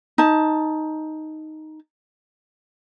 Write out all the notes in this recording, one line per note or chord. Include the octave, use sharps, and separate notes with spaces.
D#4 A5